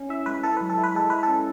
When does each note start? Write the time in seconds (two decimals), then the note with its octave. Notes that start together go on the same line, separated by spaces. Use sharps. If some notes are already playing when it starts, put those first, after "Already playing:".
Already playing: C#4
0.09 E4 E5
0.26 G#3 B4
0.43 E4 A4
0.57 F#3 B4
0.69 A4
0.78 E4
0.84 B4
0.95 G#3 A4
1.10 E4 B4
1.23 C#4 A4